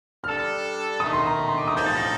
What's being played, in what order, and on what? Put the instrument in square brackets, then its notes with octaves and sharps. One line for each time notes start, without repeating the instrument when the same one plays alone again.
[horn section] G3 D4 A4 [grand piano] F6
[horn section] D#3 A3 D#4 [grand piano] D#6
[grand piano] C6
A#5
A#5
C6
D6
D#6
[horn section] A2 F3 C4 D#4 A4 [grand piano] G6
[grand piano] A6
A#6